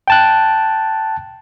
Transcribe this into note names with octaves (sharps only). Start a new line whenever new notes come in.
G5 A5 F#6